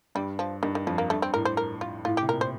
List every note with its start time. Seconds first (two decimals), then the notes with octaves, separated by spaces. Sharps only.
0.15 G2 G3
0.39 F3
0.63 G2 D#3
0.75 D#3
0.87 F2 F3
0.98 A#3
1.10 G2 A3
1.22 C4
1.34 A2 A#4
1.45 C5
1.57 A#4
1.81 F4
2.05 A2 F4
2.17 G4
2.22 C3
2.28 A#2 A#4
2.41 C5